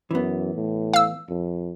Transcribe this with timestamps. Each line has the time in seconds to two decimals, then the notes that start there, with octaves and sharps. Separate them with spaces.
0.11 F#2 E3 B3
0.54 A2
0.94 F5 E6
1.29 F2